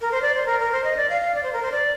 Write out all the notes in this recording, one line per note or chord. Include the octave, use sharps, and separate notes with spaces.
A#4
C5
D5
C5
A#4
A#4
C5
D#5
D5
F5
F5
D5
C5
A#4
C5
D5